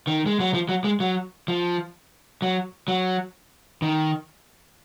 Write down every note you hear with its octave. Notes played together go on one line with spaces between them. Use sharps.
D#3
G#3
F#3
F3
F#3
G#3
F#3
F3
F#3
F#3
D#3